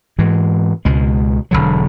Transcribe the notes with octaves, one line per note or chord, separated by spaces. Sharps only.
G#2 E3 G#3
C#2 B2 G#3
E1 D2 D3 F#3